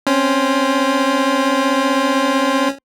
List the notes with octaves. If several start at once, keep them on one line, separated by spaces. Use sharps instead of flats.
C4 C#4